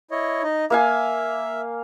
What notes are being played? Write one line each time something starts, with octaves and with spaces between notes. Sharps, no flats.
E4 C#5 D#5
D#4 D#5
A#3 E5 F5 G#5